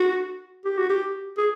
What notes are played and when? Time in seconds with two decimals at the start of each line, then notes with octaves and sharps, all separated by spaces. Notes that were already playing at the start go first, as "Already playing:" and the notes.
Already playing: F#4
0.65 G4
0.77 F#4
0.89 G4
1.37 G#4